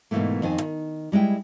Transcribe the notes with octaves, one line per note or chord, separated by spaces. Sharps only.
G#2 B2 D3 E3 A3 A#3
F2 D#3 C5 G#5
D#3
G3 G#3 E4 G5